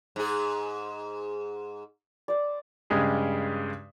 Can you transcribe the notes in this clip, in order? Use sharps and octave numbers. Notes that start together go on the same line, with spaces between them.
G#2 G#4
C5 D5
G2 C#3 G#3 G4 G#4